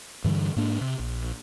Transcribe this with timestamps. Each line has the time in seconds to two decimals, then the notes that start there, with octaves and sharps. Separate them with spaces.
0.24 G2 D3 E3 G3
0.56 G#2 A#3 D4
0.81 C3
0.99 A#1